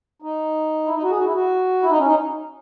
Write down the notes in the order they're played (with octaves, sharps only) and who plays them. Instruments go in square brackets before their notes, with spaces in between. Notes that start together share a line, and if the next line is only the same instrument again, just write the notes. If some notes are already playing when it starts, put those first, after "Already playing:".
[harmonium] D#4
E4
D#4
F#4
G#4
F#4
E4
F#4
E4
D#4
C#4
D#4